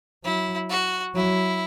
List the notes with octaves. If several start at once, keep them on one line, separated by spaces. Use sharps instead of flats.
F#3 E4
F#4
F#3 E4